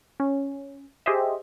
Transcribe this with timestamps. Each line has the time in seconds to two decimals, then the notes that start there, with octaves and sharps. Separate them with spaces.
0.20 C#4
1.06 G4 G#4 C5 D#5 E5